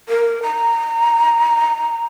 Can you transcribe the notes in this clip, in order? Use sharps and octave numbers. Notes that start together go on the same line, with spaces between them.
A#4
A#5